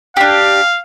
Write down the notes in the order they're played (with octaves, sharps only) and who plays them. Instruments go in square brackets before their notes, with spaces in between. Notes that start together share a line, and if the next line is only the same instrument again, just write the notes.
[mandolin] D4 G4 [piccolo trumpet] F5